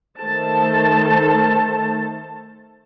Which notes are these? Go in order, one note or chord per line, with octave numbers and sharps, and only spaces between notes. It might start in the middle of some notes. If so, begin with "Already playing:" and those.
D#3 A3 A4 C5 A5